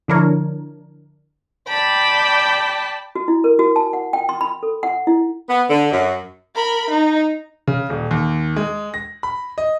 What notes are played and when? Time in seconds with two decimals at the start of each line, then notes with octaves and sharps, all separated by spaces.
0.08 D3 F3 D4 E4 A#4 C#5
1.68 D5 G5 A5 B5
3.15 F#4
3.28 E4
3.44 A#4
3.59 F#4
3.76 A5
3.93 F#5
4.13 G5
4.29 C6
4.41 B5
4.63 A4
4.83 F#5
5.07 E4
5.49 B3
5.70 D3
5.92 F#2
6.55 A#4 B5
6.90 D#4
7.67 C#3
7.90 D#1
8.11 D#2
8.56 G#3
8.94 A#6
9.23 B5
9.58 D#5